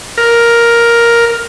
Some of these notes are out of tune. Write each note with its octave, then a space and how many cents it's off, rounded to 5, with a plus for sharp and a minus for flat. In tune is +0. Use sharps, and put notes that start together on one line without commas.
A#4 +5